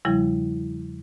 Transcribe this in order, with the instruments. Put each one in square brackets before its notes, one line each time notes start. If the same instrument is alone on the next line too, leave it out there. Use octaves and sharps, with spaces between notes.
[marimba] E2 C#3 F3 G3 E4